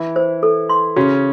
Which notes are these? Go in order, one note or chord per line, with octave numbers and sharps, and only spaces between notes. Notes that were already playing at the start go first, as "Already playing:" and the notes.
Already playing: E3 E4
C5
A4
C6
C#3 C#4 F#4